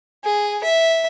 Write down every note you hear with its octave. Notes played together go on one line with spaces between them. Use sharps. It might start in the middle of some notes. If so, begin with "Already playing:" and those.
G#4
E5